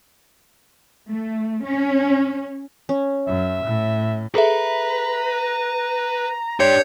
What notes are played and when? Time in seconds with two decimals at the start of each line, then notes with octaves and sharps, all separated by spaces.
1.09 A3
1.65 C#4
2.89 C#4
3.27 F#2 E5
3.64 A2
4.35 G#4 A4 B4 E5 A#5
6.60 D4 G4 C#5 C6 G6 C#7